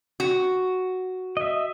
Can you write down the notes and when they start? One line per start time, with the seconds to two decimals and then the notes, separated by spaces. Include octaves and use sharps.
0.20 F#4
1.37 D#5 E5